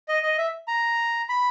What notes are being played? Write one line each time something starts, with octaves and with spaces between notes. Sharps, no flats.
D#5
D#5
E5
A#5
B5